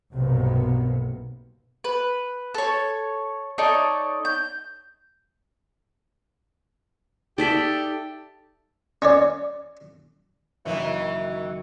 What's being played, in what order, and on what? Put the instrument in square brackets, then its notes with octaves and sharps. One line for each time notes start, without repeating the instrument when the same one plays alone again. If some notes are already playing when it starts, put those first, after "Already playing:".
[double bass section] B1 G2 C3 A#3 B3
[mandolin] B4
A4 C#5
D#4 A4 C#5 D5
G6
[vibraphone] D#4 [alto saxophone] G4 [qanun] A4 D5 E5
[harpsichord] C#4 C#5 D5
[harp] F#1 [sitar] D#3 E3 F#3 [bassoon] E4